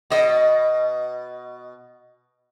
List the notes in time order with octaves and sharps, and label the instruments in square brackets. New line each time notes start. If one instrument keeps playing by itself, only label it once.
[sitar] B2 D#5